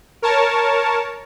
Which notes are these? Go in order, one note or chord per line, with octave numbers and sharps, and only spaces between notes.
A#4 C#5 A5